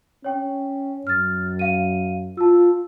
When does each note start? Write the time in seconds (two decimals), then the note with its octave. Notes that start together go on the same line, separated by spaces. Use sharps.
0.24 C#4 C#5 G5
1.07 F#2 F6 A6
1.59 F5 D#7
2.37 F4 A5 E6